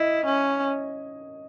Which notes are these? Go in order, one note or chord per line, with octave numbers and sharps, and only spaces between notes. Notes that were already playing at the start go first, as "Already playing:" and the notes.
Already playing: E4 D#5
C#4